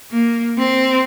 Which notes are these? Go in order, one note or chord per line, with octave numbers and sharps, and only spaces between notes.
A#3
C4